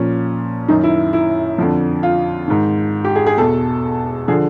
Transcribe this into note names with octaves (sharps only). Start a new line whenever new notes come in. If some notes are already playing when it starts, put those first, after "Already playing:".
Already playing: A#2 F3 C#4
F#2 D#3 D#4
E4
E4
F2 D3 F3
F4
G#2 D#3
G4
G#4
G#4
E2 B2 A4
D3 F3 G#4